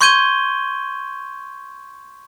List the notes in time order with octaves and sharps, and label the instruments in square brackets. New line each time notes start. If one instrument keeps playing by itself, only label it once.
[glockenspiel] C6 C#6 G6 G#6 D#7 G7